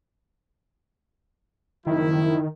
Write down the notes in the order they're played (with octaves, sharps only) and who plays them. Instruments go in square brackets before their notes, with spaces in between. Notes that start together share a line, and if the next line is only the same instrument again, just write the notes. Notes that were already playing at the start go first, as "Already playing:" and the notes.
[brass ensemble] F#1 F3 E4 [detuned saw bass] D#3